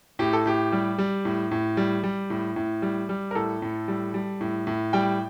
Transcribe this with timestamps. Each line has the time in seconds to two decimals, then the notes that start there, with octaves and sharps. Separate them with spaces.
0.19 A2 G4
0.33 A4
0.45 A2 G4
0.72 G3
0.98 G3
1.25 A2
1.51 A2
1.77 G3
2.03 G3
2.30 A2
2.56 A2
2.82 G3
3.09 G3
3.31 A#4
3.35 A2 A4
3.62 A2
3.88 G3
4.14 G3
4.41 A2
4.67 A2
4.93 G3 G5